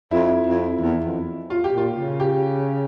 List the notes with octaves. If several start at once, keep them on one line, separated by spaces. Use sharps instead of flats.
F2 E4
F2
E2
F2
F4
G4
A#2 F4
C#3
G4